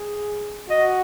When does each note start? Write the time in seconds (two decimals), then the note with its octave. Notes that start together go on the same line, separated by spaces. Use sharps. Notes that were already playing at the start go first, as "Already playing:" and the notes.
Already playing: G#4
0.70 F#4 D#5